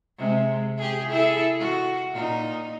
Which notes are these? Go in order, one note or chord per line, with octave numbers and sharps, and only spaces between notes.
C3 G#3
G4 G#4
E4 G#4 A4
F#4
A#2 D#4